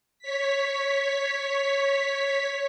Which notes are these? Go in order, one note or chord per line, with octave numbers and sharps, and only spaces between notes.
C#5 B6